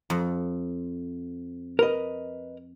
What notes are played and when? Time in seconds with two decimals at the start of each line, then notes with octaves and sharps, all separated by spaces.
0.10 F2
1.79 A#4 B4 D#5